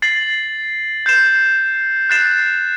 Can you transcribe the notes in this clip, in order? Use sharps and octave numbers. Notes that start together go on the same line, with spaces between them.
A6 C7 F#7
G6 C7 E7
F#6 A6 C7 E7